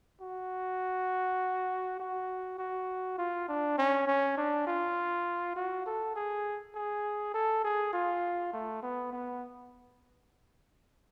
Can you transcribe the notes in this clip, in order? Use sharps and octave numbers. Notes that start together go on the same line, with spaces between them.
F#4
F#4
F#4
F4
D4
C#4
C#4
D4
F4
F#4
A4
G#4
G#4
A4
G#4
F4
A3
B3
B3